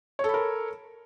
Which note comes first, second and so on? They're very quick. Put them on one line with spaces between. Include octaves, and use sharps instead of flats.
C#5 A4 B5 A#4